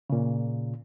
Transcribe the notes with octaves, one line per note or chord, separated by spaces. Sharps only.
A#2 C#3